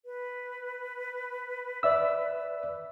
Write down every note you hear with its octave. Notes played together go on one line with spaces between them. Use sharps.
B4
D5 E5 E6